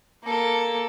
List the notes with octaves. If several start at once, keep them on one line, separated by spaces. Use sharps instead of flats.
A#3 A4